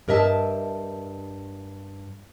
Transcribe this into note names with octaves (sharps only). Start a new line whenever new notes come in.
G2 A#4 D#5 E5 A5